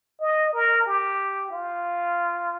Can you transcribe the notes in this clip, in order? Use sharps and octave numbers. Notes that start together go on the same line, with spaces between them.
D#5
A#4
G4
F4